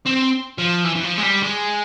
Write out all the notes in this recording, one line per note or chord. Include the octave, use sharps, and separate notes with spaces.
C4
F3
E3
E3
F3
G#3
G3
G#3